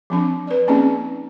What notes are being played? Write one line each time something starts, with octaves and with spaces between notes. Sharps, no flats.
F3 C4 D4
B4 D5
A#3 C4 C#4 D#4 G#4